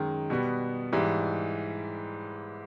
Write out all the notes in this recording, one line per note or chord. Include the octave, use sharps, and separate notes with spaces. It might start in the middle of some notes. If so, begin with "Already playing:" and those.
Already playing: F#2 D#3 G#3
B2 G3 B3
G#2 E3 G3